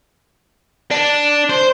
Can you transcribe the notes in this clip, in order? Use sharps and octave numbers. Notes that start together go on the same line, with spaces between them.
D4
C5